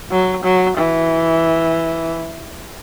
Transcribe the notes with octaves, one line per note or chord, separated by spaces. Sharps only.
F#3
F#3
E3